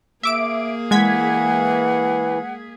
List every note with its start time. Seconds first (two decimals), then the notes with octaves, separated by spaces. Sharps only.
0.23 A#3 G#4 E5 D6 D7
0.91 E3 G#3 F#5 G#6 B6